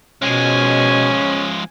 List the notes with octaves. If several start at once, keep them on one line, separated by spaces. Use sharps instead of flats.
B2 F3 G#3 C#4 G#5